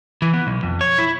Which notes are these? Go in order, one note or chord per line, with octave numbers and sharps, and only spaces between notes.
E3
B3
B1
F2
C#5
E4